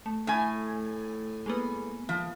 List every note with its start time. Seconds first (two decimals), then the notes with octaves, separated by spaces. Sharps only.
0.06 A3
0.27 A2 G#5
1.46 G#3 A#3 B3
2.09 F3